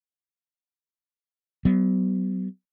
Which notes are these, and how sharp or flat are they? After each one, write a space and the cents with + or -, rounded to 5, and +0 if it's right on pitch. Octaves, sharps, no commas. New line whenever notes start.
F#3 +35 B3 +30